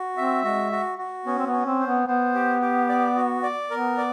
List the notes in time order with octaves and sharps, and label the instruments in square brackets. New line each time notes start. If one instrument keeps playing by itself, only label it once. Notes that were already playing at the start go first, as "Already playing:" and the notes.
Already playing: [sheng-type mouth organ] F#4
[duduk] C4 [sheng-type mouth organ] E5
[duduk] G#3 [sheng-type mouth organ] F#4
[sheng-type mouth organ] F#4
F#4
[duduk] B3 [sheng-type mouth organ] C#4
[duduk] C4
B3
[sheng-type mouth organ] C#4
[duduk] C4
[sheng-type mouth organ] C5
[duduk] B3
[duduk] B3 [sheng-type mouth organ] C5
[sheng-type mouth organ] G4
G4
D5
F#4
D5
[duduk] B3 [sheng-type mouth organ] A#4
[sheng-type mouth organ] D5